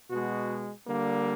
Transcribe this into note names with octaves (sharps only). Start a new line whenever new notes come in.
B2 G#3 F#4
D3 G3 A#3